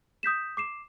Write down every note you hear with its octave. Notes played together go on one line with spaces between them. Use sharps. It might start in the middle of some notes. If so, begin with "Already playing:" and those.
D#6 G6 B6 E7
D6 C7 E7